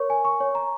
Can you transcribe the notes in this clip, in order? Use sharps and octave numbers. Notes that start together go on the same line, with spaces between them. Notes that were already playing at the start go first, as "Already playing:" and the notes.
Already playing: A#4 C#5 C#6
G#5
C#6
C#5
A#5